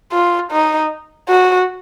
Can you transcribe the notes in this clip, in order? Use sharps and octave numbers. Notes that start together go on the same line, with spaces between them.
F4
D#4
F#4